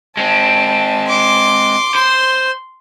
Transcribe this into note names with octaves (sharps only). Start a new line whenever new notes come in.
G#3 C4 A5
C6 D6
C5 C6